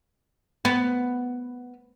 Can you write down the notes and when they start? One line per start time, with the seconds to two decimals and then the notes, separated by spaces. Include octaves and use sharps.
0.65 B3